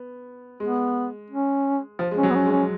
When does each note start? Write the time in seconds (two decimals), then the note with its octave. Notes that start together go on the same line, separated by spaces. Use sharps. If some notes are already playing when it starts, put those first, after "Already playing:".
Already playing: B3
0.60 G#3 B3
1.30 C#4
1.99 F3
2.11 G#3
2.17 C#4
2.23 F#3
2.30 B3
2.35 C#4
2.46 G#3
2.52 C#4